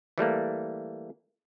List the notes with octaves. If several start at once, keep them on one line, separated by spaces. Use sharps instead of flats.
E3 G3 A3 A#3